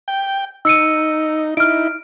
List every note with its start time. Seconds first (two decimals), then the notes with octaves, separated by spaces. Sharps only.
0.08 G5
0.65 D#4 E6 C#7 D#7
1.57 D#4 E4 F6 D7